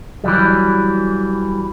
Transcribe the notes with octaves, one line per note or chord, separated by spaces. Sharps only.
E3 F#3 G3